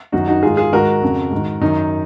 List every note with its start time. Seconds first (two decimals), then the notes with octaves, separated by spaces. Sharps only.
0.12 F#2 D#3 D#4 F#4
0.28 D#4 F#4
0.43 G#2 D#3 F4 G#4
0.57 F4 G#4
0.72 G#2 D#3 F#4 A#4
1.03 F2 C#3
1.31 G#2 D#3
1.61 F#2 D#3 D#4